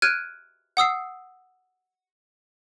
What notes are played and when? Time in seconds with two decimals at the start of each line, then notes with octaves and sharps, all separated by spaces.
0.02 F6 F#6 G#6 D7 D#7
0.77 F#5 D#6 E6 C7